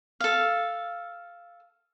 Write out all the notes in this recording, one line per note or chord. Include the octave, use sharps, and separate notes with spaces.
A4 F5